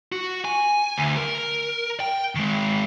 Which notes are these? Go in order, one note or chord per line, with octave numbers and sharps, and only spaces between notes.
F#4
G#5
D2
A#4
G5
D#3 G#3